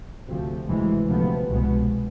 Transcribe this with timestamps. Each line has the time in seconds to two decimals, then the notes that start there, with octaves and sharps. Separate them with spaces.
0.28 D2 C3 F3
0.68 D2 C3 E3 G#3
1.09 D2 C3 F3 B3
1.49 C2 B2 G#3 B3